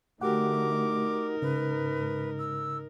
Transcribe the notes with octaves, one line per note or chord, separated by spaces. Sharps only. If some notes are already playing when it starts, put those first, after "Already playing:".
D3 A3 D#4 F#4 G4 A#4 F#5 D6
G#2 C#3 B4
E6